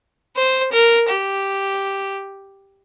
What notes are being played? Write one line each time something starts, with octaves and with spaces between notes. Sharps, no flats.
C5
A#4
G4